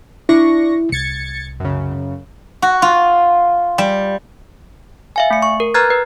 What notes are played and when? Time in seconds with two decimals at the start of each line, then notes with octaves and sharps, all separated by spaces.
0.29 D4 E4 C#6 A#6
0.92 C2 G#6 A6 C#7
1.60 F#2 C#3
2.62 F#4
2.82 F4
3.78 G3
5.16 E5 F5 G#5
5.30 A3 C#7
5.42 C#6
5.60 A#4
5.74 B4 A#5 F6 F#6 G#6 A6
5.90 B4